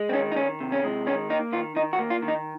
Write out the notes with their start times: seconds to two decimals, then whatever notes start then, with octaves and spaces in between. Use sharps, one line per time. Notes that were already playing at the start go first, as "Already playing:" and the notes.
Already playing: G#3
0.09 C4
0.13 D#3 C#4
0.32 D#4
0.36 D#3 C#4
0.60 C3
0.72 C#4
0.84 G#3
1.07 D#3 C#4
1.30 A#3 D#4
1.52 D#3 F4
1.76 D#3 D#4
1.93 F#4
1.99 A#3
2.10 F4
2.22 D#3
2.28 D#4